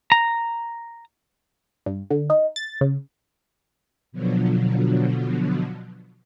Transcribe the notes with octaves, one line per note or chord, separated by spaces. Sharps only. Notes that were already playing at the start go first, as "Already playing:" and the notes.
A#5
G2
D3
D#4
A6
C#3
B2 D3 F3 F#3